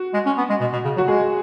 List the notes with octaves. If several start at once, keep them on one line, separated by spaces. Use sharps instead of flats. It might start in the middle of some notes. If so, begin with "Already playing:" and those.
Already playing: F#4
G#3
C#4
B3
G#3
B2
B2
C#3
F#3 F#4
G#3 G#4